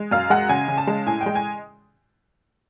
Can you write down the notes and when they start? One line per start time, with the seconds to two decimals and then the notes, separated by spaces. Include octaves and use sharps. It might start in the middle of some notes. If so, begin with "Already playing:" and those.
Already playing: G#3
0.11 F#2 F5
0.30 G#3 F#5
0.49 C#3 G#5
0.68 C#3
0.78 A5
0.87 G#3
1.06 A2 G#5
1.21 G5
1.26 G#3
1.35 G#5